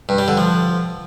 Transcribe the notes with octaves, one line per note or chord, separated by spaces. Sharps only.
G2
G3
D3
F3